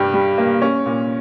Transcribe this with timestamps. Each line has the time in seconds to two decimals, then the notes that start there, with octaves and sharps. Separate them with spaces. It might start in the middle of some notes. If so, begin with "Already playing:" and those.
Already playing: G2 G3 G4
0.14 G3
0.38 A#3
0.62 C#4
0.86 A#2